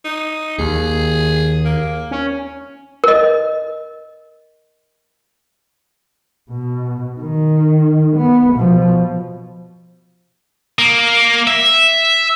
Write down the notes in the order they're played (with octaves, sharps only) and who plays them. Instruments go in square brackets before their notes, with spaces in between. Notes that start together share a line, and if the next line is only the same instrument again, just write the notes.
[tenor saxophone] D#4
[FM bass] D#2 [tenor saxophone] G#4
[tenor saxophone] A#3
[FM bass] C#4
[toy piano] A#4 D#5
[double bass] B2
D#3
B3
B2 F3
[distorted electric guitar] A#3
E5